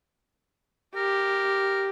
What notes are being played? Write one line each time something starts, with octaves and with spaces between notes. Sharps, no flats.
G4 A#4